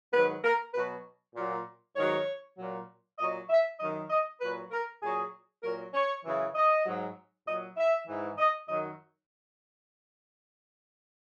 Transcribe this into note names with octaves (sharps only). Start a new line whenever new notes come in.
G#2 D#3 F#3 B4
A#4
B2 F#3 B4
A#2 F#3
G#2 D#3 F#3 C#5
A#2 F#3
A#2 F#3 D#5
E5
F#2 D#3 F#3 D#5
D#5
A#2 F#3 B4
A#4
A#2 F#3 G#4
A#2 F#3 A#4
C#5
F#2 C#3 E3
D#5
G#2 F#3
A#2 F#3 D#5
E5
G#2 E3
D#5
F#2 D#3 F#3 D#5